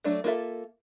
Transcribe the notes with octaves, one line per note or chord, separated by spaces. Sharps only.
F#3 A3 D4
A#3 F4 A4 E5